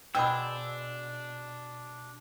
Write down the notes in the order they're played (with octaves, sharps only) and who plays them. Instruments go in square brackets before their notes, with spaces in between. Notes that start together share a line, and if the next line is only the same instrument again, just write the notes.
[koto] B2 G#4 C5 [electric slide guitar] D4 [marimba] G5 B5 [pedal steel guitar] E6